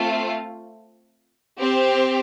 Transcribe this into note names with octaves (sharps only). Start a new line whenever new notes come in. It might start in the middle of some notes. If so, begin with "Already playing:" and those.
Already playing: A3 C4 F4
C4 G4 C5